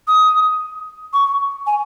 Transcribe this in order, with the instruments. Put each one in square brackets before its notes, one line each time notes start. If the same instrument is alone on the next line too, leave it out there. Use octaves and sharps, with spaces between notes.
[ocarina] D#6
C#6
G#5